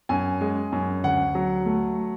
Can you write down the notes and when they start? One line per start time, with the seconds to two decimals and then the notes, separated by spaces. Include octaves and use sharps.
0.09 F#2 G#5
0.41 G#3
0.72 F#2
1.04 D2 F#5
1.35 F#3
1.66 A3